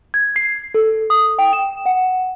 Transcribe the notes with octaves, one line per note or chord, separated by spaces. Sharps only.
G#6
C7
A4
D#6
G5
E7
F#5